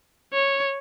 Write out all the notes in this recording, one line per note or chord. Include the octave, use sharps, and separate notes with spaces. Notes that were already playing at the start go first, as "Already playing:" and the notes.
C#5